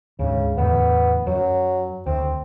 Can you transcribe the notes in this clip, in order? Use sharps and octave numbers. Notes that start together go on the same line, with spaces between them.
D2 G#2 C#3
E2 A2 D3 B3
F#2 F#3
D2 C4